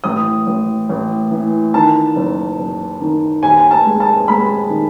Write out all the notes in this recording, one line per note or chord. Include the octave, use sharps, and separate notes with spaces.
A1 D#6
A1
A1
E3
D#3 A5
F#1
F#1
D#3
D#2 G#5
A5
G#3
A5
G#3 B5
D#3